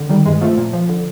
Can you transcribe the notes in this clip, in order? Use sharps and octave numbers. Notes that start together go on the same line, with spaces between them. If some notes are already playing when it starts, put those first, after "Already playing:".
Already playing: D3
D#3 G3
G2 G#3
F3 A3
A#2
F3
D3